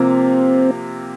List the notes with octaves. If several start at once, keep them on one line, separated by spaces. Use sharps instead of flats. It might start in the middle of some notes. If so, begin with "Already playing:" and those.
Already playing: C3 F3 A#3 C4 F4